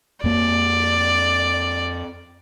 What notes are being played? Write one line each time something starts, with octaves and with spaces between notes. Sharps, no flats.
F2 A#3 D5